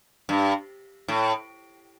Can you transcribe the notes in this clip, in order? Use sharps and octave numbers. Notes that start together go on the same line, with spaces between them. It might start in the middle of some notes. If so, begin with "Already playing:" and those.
G2
A2